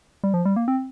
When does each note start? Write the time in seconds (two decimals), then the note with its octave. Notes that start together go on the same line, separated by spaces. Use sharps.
0.24 G3
0.34 F3
0.45 G3
0.56 A#3
0.68 C4